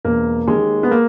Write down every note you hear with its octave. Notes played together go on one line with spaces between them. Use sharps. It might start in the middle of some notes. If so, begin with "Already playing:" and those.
E1 A#3
D#2 D#3 G#3
B3
A#3